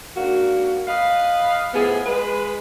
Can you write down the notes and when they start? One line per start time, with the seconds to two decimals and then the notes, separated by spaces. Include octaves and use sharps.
0.17 G#2 A#3 D4 F#4
0.88 B4 D#5 F5
1.74 A2 F3 B3 G#4
2.06 G#3 B4